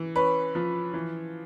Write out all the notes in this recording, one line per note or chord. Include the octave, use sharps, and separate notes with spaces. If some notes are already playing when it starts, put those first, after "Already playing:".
Already playing: E3
C#4 B4
F3
E3